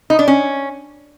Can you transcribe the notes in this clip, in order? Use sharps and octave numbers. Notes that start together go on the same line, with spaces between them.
D#4
D4
C#4